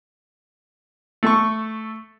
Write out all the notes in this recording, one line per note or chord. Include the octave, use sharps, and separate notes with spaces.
A3 A4 C#6